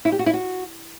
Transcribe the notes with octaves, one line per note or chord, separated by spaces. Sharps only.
E4
G4
F#4
E4
F#4